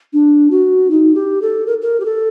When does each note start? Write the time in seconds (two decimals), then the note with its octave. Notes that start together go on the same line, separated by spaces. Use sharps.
0.13 D4
0.51 F#4
0.90 D#4
1.15 G4
1.42 A4
1.67 A#4
1.82 A#4
2.00 G4
2.05 A4